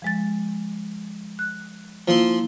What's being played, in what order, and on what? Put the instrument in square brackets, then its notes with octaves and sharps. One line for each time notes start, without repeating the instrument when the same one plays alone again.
[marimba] F3 G#3 A6
F#6
[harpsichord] F3 C6 [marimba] A#3 E4